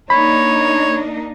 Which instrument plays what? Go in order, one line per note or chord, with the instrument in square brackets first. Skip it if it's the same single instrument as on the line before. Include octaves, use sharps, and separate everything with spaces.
[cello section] A#3 D4 D#4 [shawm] C#5 [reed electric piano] B5